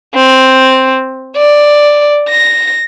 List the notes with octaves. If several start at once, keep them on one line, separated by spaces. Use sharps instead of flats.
C4
D5
A#6